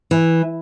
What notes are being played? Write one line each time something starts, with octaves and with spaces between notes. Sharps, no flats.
E3